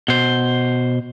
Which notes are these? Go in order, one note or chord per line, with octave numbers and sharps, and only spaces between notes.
B2 C5